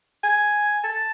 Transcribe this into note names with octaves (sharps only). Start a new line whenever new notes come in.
G#5
A5